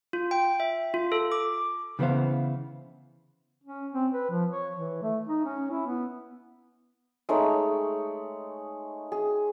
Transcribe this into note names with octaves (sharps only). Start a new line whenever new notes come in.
F4
G5
E5
F4
A4
D6
C#3 E3 B3 C5 F5
C#4
C4
B4
F3
C#5
E3
A3
D#4
C#4
E4
B3
G#3 A3 D#4 C#5
G#4